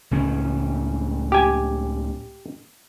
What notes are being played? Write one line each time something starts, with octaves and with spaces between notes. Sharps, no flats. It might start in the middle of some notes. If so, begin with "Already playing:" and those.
C#2 A2 C#4
G4 G#5